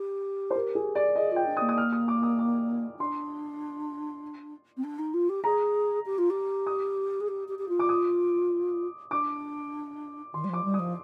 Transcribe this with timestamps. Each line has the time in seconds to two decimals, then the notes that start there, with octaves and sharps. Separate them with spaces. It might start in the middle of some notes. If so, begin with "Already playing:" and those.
Already playing: G4
0.50 C5
0.55 A#4
0.75 G#4
0.95 D5
1.15 G#4 D#5
1.32 F4 G5
1.46 D4
1.57 D#6
1.62 A#3
1.69 D#6
1.78 F6
1.93 D#6
2.08 D6
2.23 D#6
2.39 D6
2.99 D4 C6
4.77 C4
4.84 D4
4.99 D#4
5.14 F4
5.29 G4
5.44 G#4 A#5
6.06 G4
6.18 F4
6.30 G4
6.67 D#6
7.20 G#4
7.28 G4
7.48 G4
7.58 G4
7.69 F4
7.79 D6
7.89 D#6
9.11 D4 D6
10.34 D#3 C6
10.44 G3
10.49 F3 D6
10.64 G3
10.74 D#6
10.79 F3